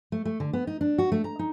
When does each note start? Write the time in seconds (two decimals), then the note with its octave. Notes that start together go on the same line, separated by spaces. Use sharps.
0.12 A3
0.25 A3
0.40 D3
0.53 B3
0.67 D#4
0.81 D4
0.98 F#4
1.12 A3
1.24 A#5
1.39 D#4